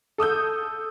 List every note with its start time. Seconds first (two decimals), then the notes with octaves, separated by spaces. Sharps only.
0.18 A4 D#6 E6 G6